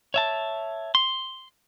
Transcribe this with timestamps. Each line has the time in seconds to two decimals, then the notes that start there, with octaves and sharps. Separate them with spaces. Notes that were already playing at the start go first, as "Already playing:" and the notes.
0.14 C#5 E5 A5
0.95 C6